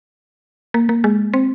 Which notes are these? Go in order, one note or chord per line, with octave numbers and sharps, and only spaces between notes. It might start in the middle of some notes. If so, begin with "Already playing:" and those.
A#3
A#3
G#3
C4